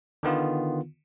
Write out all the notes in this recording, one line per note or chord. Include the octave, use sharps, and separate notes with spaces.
D3 D#3 B3 F4